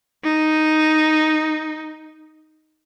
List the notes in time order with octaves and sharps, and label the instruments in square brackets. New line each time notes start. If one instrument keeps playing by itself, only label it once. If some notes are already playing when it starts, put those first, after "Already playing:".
[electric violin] D#4